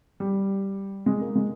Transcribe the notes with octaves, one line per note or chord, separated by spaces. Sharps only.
G3
G#3
A#3
G#3